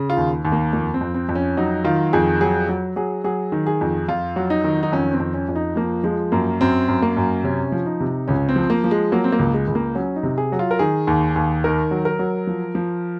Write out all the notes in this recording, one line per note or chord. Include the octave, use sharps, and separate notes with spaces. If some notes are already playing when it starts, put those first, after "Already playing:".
Already playing: C#3
F4
D#2
D#2
A#3
F2 A#3
C4
F2
C4
F2
C#4
F#3 D#4
D#3 F4
F2 G#4
F#3 G#4
F#3
F#3 G#4
F#3 G#4
D#3
G#4
F2
F2 F4
F#3
D#4
D#3
D#4
F2 C#4
C4
F2
C#4
F2
D#4
F3 A#3
F3 G#3
F#2 A#3
F#2 C4
F#2
A#3
F#2
C3 C#4
F3
D#4
C3
C#2 C#4
C4
F3
A#3
F3
G#3
F#3 A#3
C4
A#3
C#2
G#3
C#2
A#3
F#3 C#4
D#4
C3
G#4
F#3
F4
A#4
D#3 G#4
D#2
D#2
D#3 A#4
F#3
A#4
F#3
F3
F3